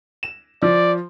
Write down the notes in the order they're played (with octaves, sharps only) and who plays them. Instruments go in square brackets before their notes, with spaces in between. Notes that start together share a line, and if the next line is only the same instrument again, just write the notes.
[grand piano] E7
[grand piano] F3 [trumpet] D5